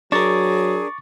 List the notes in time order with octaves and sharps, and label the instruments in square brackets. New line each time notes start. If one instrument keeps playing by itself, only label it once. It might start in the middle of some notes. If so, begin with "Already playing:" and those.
[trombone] F#3 [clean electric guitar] D4 A#4 [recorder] G#4 [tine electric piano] C#6 D6 A6